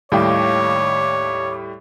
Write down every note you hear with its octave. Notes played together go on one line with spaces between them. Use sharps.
D#2 A2 G3 C#5 F5 G5 D6